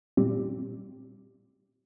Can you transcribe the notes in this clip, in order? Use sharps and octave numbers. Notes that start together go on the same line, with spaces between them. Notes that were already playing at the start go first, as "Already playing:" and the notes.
A#2 G3 C4 G4